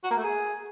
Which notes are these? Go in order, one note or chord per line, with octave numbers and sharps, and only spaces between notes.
F#4
A#3
A3
G#4